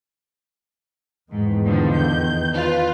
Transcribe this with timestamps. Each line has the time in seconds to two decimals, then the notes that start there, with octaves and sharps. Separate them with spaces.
1.32 E2 G#2 D#3
1.65 D3 F3
1.95 G6
2.55 F4 B4